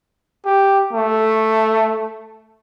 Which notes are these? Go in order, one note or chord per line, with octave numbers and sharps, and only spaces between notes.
G4
A3